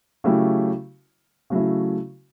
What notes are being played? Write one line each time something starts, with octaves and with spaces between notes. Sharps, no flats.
C#3 F#3 A3 E4 G4
C#3 F#3 A3 E4